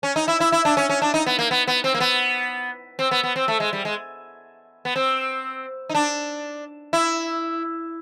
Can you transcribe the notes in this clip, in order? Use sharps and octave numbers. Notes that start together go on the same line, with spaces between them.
C#4
D#4
E4
E4
E4
D4
C#4
C#4
D4
D#4
B3
A#3
B3
B3
C4
A#3
B3
C4
B3
B3
C4
A3
G#3
G3
G#3
B3
C4
D#4
D4
E4